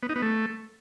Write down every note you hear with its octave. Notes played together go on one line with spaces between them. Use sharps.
B3
D#4
B3
A3